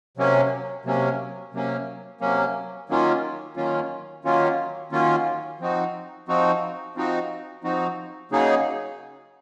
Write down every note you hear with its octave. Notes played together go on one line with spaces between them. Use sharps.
C3 F#3 A#3 C#4
C3 F#3 A#3 C#4
C3 F#3 A#3 C#4
C3 F#3 A#3 C#4
D#3 F#3 A#3 C#4 F4
D#3 F#3 A#3 C#4 F4
D#3 F#3 A#3 C#4 F4
D#3 F#3 A#3 C#4 F4
F3 C4 D#4 F#4
F3 C4 D#4 F#4
F3 C4 D#4 F#4
F3 C4 D#4 F#4
C#3 F#3 A#3 D#4 G#4